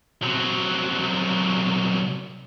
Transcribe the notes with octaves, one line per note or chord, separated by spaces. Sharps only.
C2 F#3